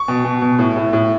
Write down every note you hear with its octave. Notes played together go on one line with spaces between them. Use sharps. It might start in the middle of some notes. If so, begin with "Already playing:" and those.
Already playing: C#6
B2
B2
B2
A2
A2
A2